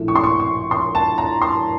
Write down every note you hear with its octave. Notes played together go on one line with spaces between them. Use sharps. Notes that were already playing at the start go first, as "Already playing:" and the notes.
Already playing: A#1 A2 A3
C#6
C6
C#6
C#6
C6
A5
A#5
C6